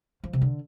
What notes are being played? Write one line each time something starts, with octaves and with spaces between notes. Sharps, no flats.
F3
C3
D3